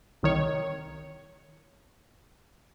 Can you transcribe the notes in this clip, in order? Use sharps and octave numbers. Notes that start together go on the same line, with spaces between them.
C2 D#3 C#5